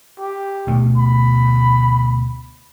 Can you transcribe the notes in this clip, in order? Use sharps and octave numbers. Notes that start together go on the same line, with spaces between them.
G4
D2 B2 A3
B5